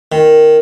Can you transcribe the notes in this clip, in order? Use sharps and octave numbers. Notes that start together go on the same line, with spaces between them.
D#3